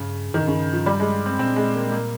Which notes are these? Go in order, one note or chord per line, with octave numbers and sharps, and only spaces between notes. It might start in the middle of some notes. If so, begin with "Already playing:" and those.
Already playing: G2 C#3
G2 D#3
G#2
G2 C#3
F3
G3
G#3
C4
A#2 C4
G#3
A#3
A#3